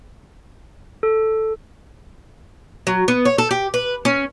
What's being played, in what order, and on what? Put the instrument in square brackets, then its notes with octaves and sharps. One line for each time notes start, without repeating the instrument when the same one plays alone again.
[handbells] A4
[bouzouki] F#3
B3
C#5
A4
G4
B4
C#4